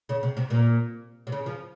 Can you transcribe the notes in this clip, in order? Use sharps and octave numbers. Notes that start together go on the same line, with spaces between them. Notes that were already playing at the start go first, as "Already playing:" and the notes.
C#3
C3
C3
A#2
C3
C#3
F3